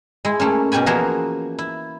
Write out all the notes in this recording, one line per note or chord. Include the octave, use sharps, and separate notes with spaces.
G#3 E4
A3 A#3 C#4
B2 C#4 G4 G#5 B5
E3 F3 A#3 F#4 G#4 E5
E4